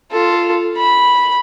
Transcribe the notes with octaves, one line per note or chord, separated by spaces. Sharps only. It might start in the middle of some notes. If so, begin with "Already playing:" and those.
F4 A4
B5